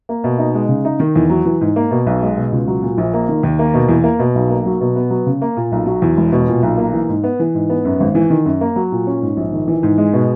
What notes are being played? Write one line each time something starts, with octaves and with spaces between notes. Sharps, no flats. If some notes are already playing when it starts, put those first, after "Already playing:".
A#3
B2
D#4
G#3
C#3
D#4
D#3
E2
F#3
E3
G#2
A#3
B2
B1
G#3
B2
C#2
F#3
A#2
A#1
A#3
D#3
D#2
A#3
B2
E2
A#3
B2
B1
A#3
F#3
B2
B3
F#3
C#3
A#3
A#2
B1
F#3
E2
E1
B2
A#2
B1
A#3
E3
G#2
B3
E3
G#2
B3
F#2
G#1
E3
D#3
F#2
A#3
F#3
A#2
C#4
G#2
A#1
D#3
E3
G#2
G#3
B2